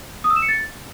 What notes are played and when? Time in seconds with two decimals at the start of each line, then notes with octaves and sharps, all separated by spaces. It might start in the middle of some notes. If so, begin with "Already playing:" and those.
0.24 D#6
0.30 E6
0.36 E7
0.42 C#7
0.48 A6